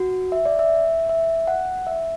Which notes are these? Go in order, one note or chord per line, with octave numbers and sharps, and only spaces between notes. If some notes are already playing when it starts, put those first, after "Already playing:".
Already playing: F#4
E5
D5
E5
E5
F#5
E5